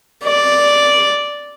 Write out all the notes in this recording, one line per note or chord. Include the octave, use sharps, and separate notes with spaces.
D5